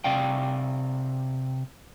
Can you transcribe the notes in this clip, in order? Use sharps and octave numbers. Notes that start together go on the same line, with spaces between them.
C3 D5 F5 G5